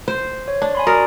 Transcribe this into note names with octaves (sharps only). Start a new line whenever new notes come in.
C5
C#5
D4
G#5 B5 C6
F#4 A#4 D5 D#6